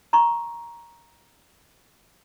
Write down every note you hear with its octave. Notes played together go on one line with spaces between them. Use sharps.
A#5 C6 C#6